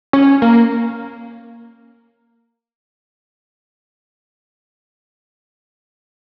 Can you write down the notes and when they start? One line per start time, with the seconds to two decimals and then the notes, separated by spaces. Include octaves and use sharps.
0.13 C#4
0.42 A#3